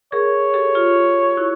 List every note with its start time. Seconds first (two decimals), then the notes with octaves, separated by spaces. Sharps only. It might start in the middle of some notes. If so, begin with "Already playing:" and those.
0.12 G#4 A#4 C#5
0.54 G4 A4
0.75 F4 G4
1.37 E4 F#4